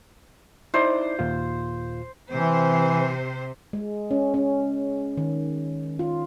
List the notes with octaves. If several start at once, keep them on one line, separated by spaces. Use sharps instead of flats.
D#4 E4 C5 D5
D#2 A#2 F4
C3 E3 C5
G#3
C#4
C#4
D#3
F4